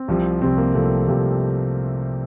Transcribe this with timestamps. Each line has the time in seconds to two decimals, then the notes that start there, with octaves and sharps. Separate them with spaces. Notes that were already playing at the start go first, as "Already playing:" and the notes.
Already playing: C4
0.08 C2 C3 F3
0.42 C2 C3 F3 C4
0.58 A#3
0.74 C2 C3 F3 A3
1.08 C2 C3 F3